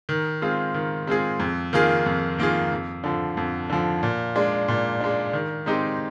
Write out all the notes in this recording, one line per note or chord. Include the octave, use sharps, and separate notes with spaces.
D#3
G#3 C4 F4 G#4
D#3
G#3 C4 F4 G#4
F2
D#3 A#3 F4 G#4
F2
D#3 A#3 F4 G#4
F2
D3 F3
F2
D3 F3
A#2
G#3 D4
A#2
G#3 D4
D#3
G#3 C4 D#4 G4